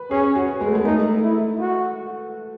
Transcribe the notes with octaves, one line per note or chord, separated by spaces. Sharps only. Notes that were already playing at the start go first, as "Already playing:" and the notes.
Already playing: B4
C#4 G#4
F#4
G#3
A3
G#3
A3 D#4
E4
F#4